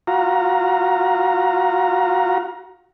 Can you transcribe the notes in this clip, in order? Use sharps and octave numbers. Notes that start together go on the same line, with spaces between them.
F4 F#4 A#5